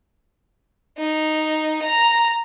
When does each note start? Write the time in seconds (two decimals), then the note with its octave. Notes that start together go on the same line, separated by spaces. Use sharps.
0.98 D#4
1.82 A#5